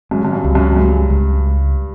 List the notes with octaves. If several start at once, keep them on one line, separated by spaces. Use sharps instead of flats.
F#2 G#3
F#2
G2
C#2
F#2
G2 G#3
C#2